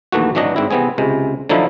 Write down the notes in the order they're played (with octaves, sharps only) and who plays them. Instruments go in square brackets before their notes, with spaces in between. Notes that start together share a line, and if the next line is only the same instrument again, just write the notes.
[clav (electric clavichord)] A#1 D#2 E3 A3 F#4
G#1 E3 F#3 D4 D#5
G#2 C4 E4
C3 E3 B3 C4 G#4
C#2 C3 G#3
D3 F3 F#3 D#4 E4